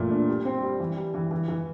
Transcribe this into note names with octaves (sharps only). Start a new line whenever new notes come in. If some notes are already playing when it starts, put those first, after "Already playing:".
Already playing: A#2 E3 A3
D4
G3
C4
G3
E3
G3
E3
E3
E3